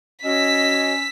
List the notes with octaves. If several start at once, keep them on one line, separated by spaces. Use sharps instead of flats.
C#4 F#4 C#5 D#5 E6 B6